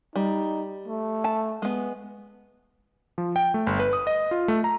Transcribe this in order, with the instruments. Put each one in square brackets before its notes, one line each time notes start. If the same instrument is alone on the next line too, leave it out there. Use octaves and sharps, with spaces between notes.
[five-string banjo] G3 [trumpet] D#4
[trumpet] A3
[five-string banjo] A5
G#3 B3
[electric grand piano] F3
G5
A3
G1
B4
D#6
D#5
F4
A3
A#5